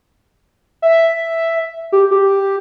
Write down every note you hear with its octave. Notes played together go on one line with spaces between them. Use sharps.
E5
G4
G4